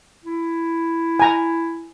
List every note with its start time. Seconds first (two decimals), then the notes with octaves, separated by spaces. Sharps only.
0.25 E4
1.20 G#5 A#5